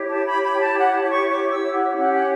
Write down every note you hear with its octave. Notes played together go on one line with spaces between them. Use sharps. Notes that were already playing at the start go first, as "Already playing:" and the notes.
Already playing: E4 G4 C#5
A5
B5
B5
G5
A5
F#5
D6
C#6
D6
E6
F#5
C#4 G4 C#5 F#5
F#5